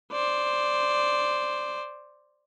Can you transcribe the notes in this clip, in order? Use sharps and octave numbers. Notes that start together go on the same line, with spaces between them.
C5 D5